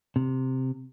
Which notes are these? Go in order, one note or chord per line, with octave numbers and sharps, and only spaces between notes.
C3